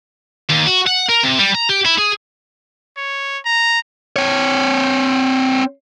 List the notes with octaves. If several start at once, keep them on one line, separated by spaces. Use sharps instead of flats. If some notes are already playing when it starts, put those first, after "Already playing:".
D#2
F#4
F#5
A#4
C3
G3
A#5
G4
E4
G#4
C#5
A#5
C4 C#5